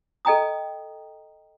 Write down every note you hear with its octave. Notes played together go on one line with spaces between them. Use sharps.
A4 D#5 G5 A#5 D#6